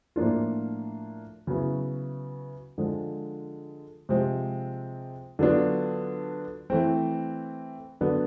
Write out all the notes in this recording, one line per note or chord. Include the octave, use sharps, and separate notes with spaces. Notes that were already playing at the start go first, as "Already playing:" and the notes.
A2 F3 A#3 D4 F4
C#3 F#3 B3 E4
D3 F3 G#3
C3 F3 G#3 C4
D3 F#3 B3 D4 F4
E3 A3 C4
D3 F#3 B3 D4